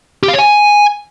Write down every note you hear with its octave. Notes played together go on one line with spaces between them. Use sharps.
G4
F5
C#5
G#5